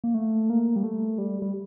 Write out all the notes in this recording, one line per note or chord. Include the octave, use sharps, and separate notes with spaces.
A#3
A3
A#3
G3
A3
G3
G3